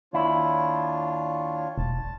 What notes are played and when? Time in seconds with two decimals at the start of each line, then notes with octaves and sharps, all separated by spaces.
0.13 D#2 D4 E4 F4 C#5
1.78 E1 A5